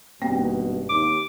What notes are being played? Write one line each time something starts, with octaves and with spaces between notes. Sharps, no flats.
G#1 G2 B2 A#3 C4 G5
D#2 D6